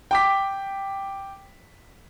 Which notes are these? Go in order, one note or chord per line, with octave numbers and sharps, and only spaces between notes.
G5 D6 B6